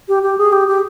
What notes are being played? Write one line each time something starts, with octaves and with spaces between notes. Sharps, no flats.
G4
G4
G#4
G4
G4